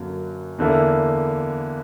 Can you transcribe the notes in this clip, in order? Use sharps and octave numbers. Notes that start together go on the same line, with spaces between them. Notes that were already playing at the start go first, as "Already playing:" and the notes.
Already playing: F#2 D3 F#3 A#3
E2 D3 A#3 E4